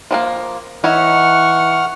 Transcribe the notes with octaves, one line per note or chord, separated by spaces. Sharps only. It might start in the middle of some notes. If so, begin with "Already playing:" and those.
F3 G#3 A#3
E3 D#4 C#5 E5 F#5 C#6 F6